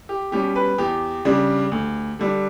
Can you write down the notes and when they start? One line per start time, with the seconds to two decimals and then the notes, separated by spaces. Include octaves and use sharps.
0.09 G4
0.32 B2 G3 C#4 G4
0.56 B4
0.78 E2 G4
1.25 C#3 G3 D4
1.72 D2
2.19 D3 G3 D4